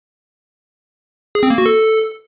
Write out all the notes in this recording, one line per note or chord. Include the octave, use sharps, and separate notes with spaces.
G#4
C4
A#3
F#4
A4